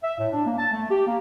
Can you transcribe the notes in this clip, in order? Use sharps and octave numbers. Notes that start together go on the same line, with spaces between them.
E5
A2
D4
A#3
A5
A3
G4
A#3